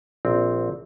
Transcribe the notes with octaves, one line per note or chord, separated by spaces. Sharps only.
A#1 C4